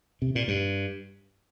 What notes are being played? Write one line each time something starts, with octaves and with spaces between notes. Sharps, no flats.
C3
A#2
G2